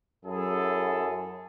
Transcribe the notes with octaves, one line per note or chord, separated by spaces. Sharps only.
F#2 E4 G#4 A4